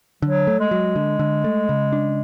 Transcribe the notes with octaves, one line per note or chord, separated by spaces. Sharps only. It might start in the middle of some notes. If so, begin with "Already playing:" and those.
D3 F#3
A3
G#3
F#3
D3
D3
A3
C#3
D4